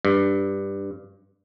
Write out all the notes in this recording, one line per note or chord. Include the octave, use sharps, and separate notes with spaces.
G2